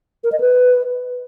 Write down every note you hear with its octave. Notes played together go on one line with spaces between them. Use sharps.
A#4
D#5
B4